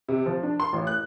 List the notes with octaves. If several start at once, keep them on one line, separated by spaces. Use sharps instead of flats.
C3
F3
D4
C6
A1
F#6